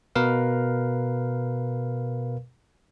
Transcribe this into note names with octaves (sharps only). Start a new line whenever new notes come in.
B2 A#4 B4 F5